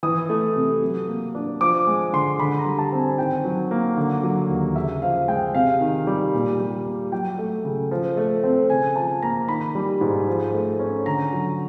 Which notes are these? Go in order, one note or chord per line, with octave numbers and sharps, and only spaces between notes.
E3 D#6
A3
C3
F#3
A#3
D4
F3 D6
G#3
D3 C6
D3 B5
A#5
G3
A5
C4
G#5
D#3 G5
F#3
A#3
D3
F#3
D#2
C#3 E5
F3 F5
G#3 G5
C3 F5
D#3
G3
A#2
G3
A#3
F#3 G5
A3
C#3
F3
A3
C4
C#3 G#5
F3 A5
A#3 A#5
D#3 B5
G3
G#2
F3
A3
C#4
D3 A#5
F#3